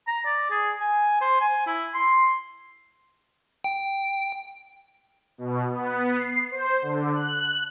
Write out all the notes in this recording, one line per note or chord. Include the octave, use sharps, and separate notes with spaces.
A#5
D5
G#4
G#5
C5
G#5
E4
C6
G5
B2
B3
C7
C5
D3
F#6